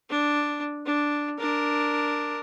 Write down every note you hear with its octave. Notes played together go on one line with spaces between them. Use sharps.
D4
D4
D4 A#4